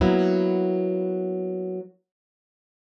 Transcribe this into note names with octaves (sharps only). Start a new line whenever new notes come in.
F#3 A#3 B3 E4